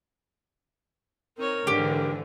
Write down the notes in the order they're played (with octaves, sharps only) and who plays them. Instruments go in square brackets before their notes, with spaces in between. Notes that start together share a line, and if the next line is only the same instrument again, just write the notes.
[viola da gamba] C4 D#4 C#5 [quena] A#4
[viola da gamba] G#2 E3 [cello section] D3 [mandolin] G4